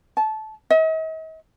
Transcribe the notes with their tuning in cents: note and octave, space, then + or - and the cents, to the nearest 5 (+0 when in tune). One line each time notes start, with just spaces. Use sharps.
A5 -20
D#5 +45